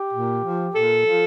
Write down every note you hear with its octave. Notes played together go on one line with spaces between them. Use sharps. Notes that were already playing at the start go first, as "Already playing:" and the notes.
Already playing: G4
A#2
F3
A#2 A4
F3